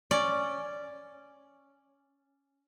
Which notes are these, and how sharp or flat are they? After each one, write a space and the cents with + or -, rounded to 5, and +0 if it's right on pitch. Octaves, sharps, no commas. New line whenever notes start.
C#4 +0 D5 +0